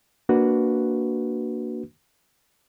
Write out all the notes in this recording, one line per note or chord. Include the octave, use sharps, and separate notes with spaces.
A#3 D4 F#4 B4